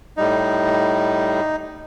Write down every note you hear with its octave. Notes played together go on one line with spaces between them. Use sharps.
A2 G3 D#4